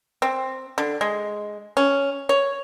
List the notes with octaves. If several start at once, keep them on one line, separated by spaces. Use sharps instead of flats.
C4
D3
G#3
C#4
C#5